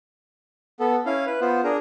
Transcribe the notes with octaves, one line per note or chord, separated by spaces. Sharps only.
B3 A4
C#4 E4 F5
B4
B3 F4 C5
D4 G#4 A#4